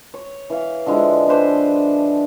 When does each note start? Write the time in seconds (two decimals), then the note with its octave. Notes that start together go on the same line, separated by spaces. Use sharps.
0.14 C#5
0.50 E3 F5
0.86 D3 F3 G#3 E4
1.28 D4 B4 C5 C6